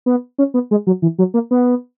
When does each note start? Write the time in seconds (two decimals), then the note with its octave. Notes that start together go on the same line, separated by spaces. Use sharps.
0.06 B3
0.38 C#4
0.54 B3
0.71 G#3
0.87 F#3
1.02 E3
1.18 F#3
1.34 A#3
1.51 B3